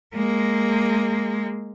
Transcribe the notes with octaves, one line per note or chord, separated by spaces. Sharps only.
G#3 A#3